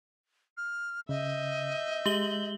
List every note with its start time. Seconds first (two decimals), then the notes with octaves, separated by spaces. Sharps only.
0.57 F6
1.09 C#3 D#5 E5 G6
2.06 G#3 G4 F#7 G7